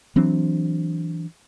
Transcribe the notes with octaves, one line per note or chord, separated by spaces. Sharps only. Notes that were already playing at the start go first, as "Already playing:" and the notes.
E3 F#3 C4 D4